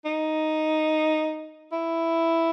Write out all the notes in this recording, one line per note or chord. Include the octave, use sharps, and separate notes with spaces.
D#4
E4